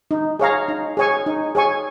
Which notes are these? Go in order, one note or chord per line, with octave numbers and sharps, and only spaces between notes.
D#4
G#4 C#5 F5 A#5
D#4
G#4 C#5 G#5 C#6
D#4
G#4 C#5 G#5 C#6